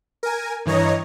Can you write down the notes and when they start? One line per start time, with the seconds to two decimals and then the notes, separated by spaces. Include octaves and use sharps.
0.23 A#4 G#5
0.66 G2 E3 C#5 D#5 A#5